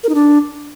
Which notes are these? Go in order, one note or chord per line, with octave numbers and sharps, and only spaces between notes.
A#4
D#4
D4